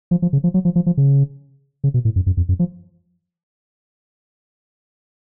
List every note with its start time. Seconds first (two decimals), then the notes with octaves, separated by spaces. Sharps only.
0.11 F3
0.22 F3
0.33 C#3
0.44 F3
0.54 F#3
0.65 F3
0.76 F3
0.86 F3
0.97 C#3
1.84 C#3
1.94 B2
2.05 A2
2.16 F#2
2.26 F#2
2.37 F2
2.49 F#2
2.59 F3